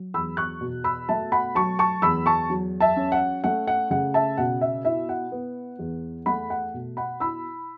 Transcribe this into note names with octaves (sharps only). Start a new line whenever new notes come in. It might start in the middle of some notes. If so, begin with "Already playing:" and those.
Already playing: F#3
E2 B5 E6
C#6 F#6
B2
B5 E6
A3 E5 A5
F#5 B5
F#3 A5 C#6
A5 C#6
E2 B5 E6
A5 C#6
F#3
E5 A5
C#4
F#5
A3 F#5
F#5
C#3 F#5
E5 A5
B2 F#5
E5
E4 E5
F#5
B3
E2
A3 F#5 B5
F#5
B2
F#5 B5
E4 B5 E6